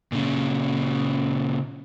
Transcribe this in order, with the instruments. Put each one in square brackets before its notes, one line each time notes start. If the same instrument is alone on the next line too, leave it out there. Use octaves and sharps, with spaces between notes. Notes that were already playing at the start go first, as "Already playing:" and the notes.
[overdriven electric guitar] A#2 C#3